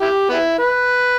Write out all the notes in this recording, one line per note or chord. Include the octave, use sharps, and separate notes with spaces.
E4 G4
B3 E4
B4